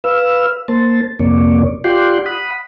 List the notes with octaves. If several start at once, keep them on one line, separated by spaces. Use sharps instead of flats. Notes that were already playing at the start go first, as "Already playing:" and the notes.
B4 F5 E6
A#3 C5 A5
F2 C3 A#3 C#5 D5
F4 G4 D5 F#5 G5 C6
F#5 B5 D#6